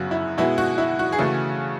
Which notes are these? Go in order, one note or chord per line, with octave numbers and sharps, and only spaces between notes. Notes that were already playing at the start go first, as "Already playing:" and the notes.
Already playing: F#2 C#3 F#3 B3 F#4
E4
B2 G#3 B3 E4
F#4
E4
F#4
G#4
C#3 E3 A3 F#4